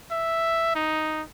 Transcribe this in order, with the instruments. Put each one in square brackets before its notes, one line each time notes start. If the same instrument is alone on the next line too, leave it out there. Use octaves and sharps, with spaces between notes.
[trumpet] E5
D#4